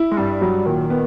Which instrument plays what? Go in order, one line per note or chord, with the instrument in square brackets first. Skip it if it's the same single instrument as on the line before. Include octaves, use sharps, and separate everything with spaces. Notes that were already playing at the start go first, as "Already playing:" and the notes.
Already playing: [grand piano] E4
[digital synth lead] G#3
[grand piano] G2 [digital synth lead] G3
[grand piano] F#3
[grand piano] A#2 [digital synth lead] D#3
[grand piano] B3